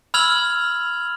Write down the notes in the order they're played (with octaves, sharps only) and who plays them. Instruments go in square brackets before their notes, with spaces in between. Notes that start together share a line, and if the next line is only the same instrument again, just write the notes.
[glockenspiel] B5 E6 F6 G#6 F7 F#7